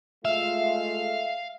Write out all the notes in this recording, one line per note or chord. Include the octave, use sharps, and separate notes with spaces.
G#3 A3 F4 E5 F5